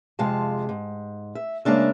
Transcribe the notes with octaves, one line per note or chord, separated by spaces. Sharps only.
F2 C3 G#3 F5 A5
G#2
E5
C#3 G#3 A#3 D4 E5